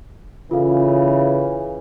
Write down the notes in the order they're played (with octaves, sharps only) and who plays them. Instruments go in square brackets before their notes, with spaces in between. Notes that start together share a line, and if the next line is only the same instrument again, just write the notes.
[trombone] C#3 [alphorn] E3 [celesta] F4 A4 F5